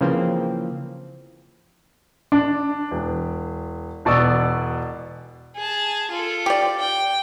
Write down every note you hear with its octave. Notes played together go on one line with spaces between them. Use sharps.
C#3 E3 F3 A#3 C4
D4
E1
E1 B2 D5 C#6 D#6 E6
G#4 A5
F4 A4
G4 D5
G5